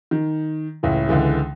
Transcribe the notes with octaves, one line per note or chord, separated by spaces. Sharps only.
D#3
C#2 A2 E3
C#2 D3 E3 G#3